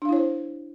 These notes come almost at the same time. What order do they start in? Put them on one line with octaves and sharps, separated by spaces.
D4 F5 E4 C#5 C5